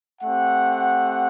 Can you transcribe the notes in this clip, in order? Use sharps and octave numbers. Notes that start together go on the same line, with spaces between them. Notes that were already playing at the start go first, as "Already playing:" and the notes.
A3 C4 G4 F#5